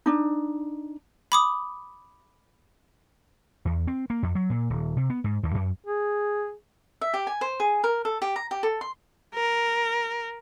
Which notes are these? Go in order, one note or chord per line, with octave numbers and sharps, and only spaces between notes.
D4 D#4
B5 D6 D#6
E2
C4
A#3
F2
F#3
A#2
D#1
C3
B3
G#2
D#2
F#2
G#4
E5
G4
G#5
C5
G#4
A#4
A4
G4
A#5
G4
A4
C6
A#4